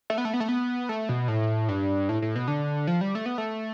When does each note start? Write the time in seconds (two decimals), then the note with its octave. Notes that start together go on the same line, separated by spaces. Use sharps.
0.10 A3
0.18 B3
0.25 A3
0.34 B3
0.40 A3
0.48 B3
0.89 A3
1.09 B2
1.28 A2
1.69 G2
2.09 A2
2.22 A2
2.35 B2
2.48 D3
2.87 F3
3.01 G3
3.15 A3
3.26 B3
3.38 A3